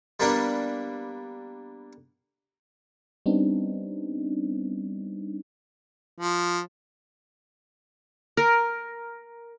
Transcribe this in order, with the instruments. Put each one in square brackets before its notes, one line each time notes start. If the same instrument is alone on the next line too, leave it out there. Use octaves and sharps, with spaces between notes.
[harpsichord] G3 A#3 B3 D4
[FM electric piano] G3 B3 C4 D4 D#4
[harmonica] F3
[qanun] A#4